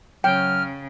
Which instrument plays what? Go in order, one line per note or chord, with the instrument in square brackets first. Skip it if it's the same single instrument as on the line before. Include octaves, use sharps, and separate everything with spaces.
[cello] C#3 [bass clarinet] F#3 [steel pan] G5 [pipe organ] F6